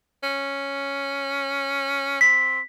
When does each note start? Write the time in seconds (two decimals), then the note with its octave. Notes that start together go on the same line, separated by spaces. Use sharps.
0.23 C#4
2.21 C4 B6